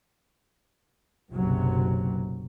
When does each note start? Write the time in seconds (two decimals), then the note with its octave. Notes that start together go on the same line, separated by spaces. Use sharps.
1.32 F#1 B1 C3 F#3